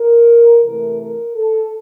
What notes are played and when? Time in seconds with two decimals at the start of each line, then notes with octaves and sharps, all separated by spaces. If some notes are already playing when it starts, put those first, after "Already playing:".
Already playing: A#4
0.64 C3 E3 A3 A#4
1.00 A#4
1.36 A4